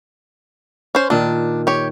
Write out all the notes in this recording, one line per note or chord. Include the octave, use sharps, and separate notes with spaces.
C#4 C5
A#2 D#3 D4
G4 C#5